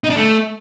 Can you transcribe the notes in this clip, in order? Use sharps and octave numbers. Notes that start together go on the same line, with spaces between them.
D#4
D4
A3